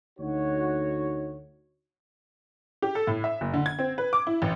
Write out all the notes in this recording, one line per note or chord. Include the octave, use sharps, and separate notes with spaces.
D2 D#4 F#4 C#5
G4
A4
A2
E5
F#1
D3
G#6
C4
B4
D6
E4
A1